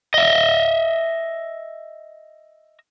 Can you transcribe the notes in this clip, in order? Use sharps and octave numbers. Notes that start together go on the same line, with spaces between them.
D#5 E5